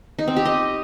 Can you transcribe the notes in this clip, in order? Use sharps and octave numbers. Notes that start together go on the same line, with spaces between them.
D#4
C4
G4
D#5